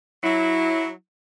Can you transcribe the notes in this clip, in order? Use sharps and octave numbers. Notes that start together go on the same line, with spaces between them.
F#3 E4